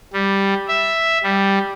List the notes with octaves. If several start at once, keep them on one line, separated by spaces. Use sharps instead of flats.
G3
E5
G3